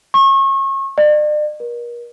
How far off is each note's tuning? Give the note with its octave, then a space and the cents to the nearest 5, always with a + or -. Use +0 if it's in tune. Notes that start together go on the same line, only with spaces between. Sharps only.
C#6 -35
D5 +40
A#4 +40